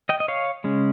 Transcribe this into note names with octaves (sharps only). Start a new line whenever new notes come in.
D#5 G5
D#5
C#5 F5
C#3 G#3 C#4